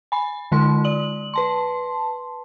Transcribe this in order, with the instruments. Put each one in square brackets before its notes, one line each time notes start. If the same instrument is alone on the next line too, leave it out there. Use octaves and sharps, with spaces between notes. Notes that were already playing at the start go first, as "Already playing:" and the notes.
[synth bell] G#5 B5
D3 G#3 F4 A#4 C6
D5 F#7
B4 A5 C6